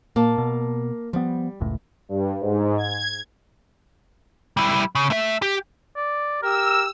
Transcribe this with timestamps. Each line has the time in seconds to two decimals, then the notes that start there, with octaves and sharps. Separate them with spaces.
0.16 A#2 A#3 A5
0.38 B2
1.13 F3 G3 B3
1.60 F#1 C#2 A2
2.09 G2
2.40 G#2
2.78 G#6
4.57 G3 E4
4.95 C#3
5.10 A3 E5
5.42 G4
5.96 D5
6.42 G4 A#4 E6